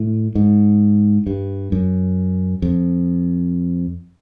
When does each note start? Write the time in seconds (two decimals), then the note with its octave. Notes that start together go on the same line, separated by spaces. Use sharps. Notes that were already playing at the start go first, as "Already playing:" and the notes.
Already playing: A2
0.35 G#2
1.27 G2
1.72 F#2
2.62 F2